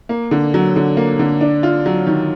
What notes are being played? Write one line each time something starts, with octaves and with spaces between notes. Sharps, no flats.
A#3
D3
F#3
D3
A#3
D3
D4
F4
F#3
D#3